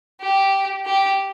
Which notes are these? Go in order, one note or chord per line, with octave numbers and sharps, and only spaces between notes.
G4
G4